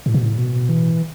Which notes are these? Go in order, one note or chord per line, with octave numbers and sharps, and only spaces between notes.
A2
B2
A2
B2
E3